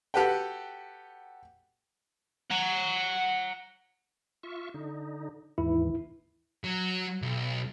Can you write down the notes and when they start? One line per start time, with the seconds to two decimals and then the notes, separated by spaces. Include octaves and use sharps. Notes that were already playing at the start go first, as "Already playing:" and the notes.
0.14 F#4 G4 A4 B4 F#5 G5
2.51 F#5 A#5
4.43 F4 E5 C#6
4.74 D3 D#4
5.58 D#2 G#2 E3 E4
6.64 F#3
7.22 B1